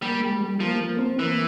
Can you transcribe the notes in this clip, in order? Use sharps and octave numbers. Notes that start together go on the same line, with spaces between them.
G3 A#3
G#3
G3
F3 A#3
A#3
C4
E3 A#3